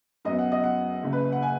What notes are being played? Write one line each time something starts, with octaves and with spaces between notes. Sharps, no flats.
F#2 F#3 B3 D#5
F#5
D#5
F#5
F#1 F#2 C#3
B4
F#5
G#5